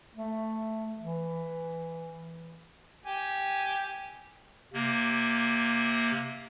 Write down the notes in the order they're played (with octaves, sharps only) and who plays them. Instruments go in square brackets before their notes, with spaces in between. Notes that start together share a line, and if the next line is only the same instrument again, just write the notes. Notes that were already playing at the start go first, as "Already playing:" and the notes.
[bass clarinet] A3
E3
[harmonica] G4 G#5
[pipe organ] C3 A#3